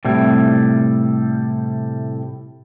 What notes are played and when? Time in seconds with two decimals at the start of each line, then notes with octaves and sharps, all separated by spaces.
0.05 A2 C3 G3 E4